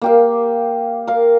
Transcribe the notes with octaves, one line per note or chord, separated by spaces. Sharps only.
A#3 G4 F5
A#4 F5